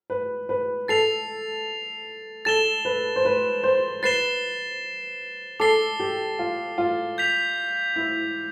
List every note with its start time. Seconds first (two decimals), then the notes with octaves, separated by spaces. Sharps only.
0.10 B4
0.49 B4
0.88 A4 A6 C7 F7
2.45 A4 A6 E7 G7
2.85 B4
3.16 C5
3.25 B4
3.63 C5
4.03 B4 A6 C7 E7 G7
5.60 A4 D6 A6 C7 G7
6.00 G4
6.39 F4
6.78 F4
7.18 G6 B6 F7
7.96 E4